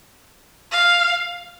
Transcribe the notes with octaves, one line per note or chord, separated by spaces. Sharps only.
F5